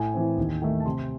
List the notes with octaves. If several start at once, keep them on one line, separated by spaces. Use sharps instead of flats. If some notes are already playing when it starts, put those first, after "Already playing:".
Already playing: A2 G#5
E3 C4
D#2
D#3 A3
A5
C3 C6